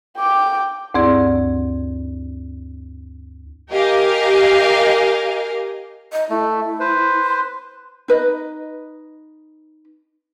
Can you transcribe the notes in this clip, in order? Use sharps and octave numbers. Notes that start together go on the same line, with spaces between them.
G5 D6
D2 G2 C4 E4 G#4 D5
G4 A#4 D#5 F5 G#5
D#5
A3 E4
B4 C5
C6
D#4 B4 D#5